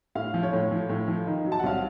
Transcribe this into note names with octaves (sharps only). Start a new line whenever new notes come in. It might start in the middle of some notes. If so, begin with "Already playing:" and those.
A2 F5
F3
C#5
A2
F3
A2
F3
D#3
F#3
A5
F#5
C2 F5